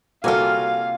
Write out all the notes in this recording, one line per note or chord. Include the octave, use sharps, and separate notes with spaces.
C3 G3 A#3 F4 F#4 A4 F5 G#5